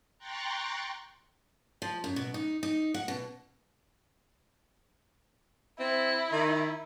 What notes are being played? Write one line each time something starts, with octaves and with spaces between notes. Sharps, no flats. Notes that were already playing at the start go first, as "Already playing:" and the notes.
G5 A#5 C6 C#6 F#6 A6
F3
F#2
B2
D#4
D#4
F#5
B2
C4 E4
D#3